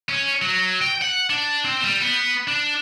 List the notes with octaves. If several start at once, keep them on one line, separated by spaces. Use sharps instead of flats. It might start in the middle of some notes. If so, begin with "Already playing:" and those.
C#4
F#3
G5
F#5
D4
C4
G3
B3
D4